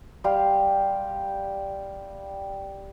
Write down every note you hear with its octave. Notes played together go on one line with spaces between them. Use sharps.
G3 G4 F5 C6